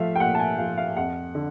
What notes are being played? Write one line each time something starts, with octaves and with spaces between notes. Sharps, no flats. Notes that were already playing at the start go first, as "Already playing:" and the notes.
Already playing: F3 A3 E5 F5
G5
A#2 F#5
A5
G#5
F3 A3 F5
F5
F2 F#5
D3